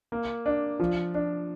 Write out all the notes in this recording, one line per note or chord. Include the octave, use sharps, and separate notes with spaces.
A#3
D4
F3
D4